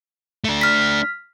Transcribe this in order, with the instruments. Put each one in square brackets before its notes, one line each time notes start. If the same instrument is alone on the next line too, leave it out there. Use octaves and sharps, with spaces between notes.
[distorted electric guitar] A3 D4
[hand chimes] F6 B6